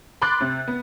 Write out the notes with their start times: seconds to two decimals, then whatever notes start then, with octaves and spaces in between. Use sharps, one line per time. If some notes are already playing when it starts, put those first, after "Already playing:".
0.22 B5 C6 D6 F#6 A6
0.41 C3
0.68 B3